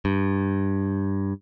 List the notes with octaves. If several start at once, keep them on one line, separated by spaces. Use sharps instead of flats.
G2